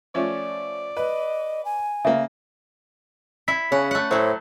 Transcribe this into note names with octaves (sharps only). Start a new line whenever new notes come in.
F3 A3 C#4 D5
B4 D#5
G#5
C#3 A#3 E5
E4 B6
C#3 C#4 F#5
A3 F#5
A2 F#3 A3 C5